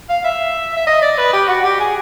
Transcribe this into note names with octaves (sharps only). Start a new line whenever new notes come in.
F5
E5
E5
D#5
D5
B4
G4
F#4
G4
G#4